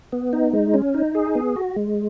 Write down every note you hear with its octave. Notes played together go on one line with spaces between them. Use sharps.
B3
D#4
G#3
C#4
D#4
G#4
B3
F#4
G#3